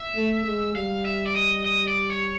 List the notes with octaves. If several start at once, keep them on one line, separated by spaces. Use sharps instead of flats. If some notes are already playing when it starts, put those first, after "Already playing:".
Already playing: E5
A3
G#3
G3 F5
E5
D5
D#5
D#5
D5
C#5